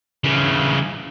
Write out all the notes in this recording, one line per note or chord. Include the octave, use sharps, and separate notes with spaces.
C#3 E3